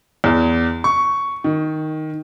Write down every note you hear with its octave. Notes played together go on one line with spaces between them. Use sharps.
E2
C#6
D#3